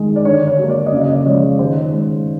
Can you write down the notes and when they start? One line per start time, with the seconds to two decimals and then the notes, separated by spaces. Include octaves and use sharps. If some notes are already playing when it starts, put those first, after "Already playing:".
Already playing: D#3 G#3
0.16 D5
0.25 D3 C#5
0.47 C#5
0.59 F#3 A#3
0.70 D5
0.86 D#5
0.92 C#3 D5
1.04 D#5
1.14 D5
1.26 F3 G#3 C#5
1.59 D#3 C5
1.93 G#3